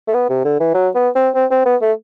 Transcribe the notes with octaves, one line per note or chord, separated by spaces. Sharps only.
A3
B3
C3
D3
E3
F#3
B3
C4
C4
C4
B3
A3